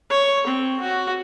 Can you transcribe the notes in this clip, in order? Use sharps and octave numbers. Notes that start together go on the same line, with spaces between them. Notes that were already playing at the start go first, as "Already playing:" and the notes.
C#5
C4
F#4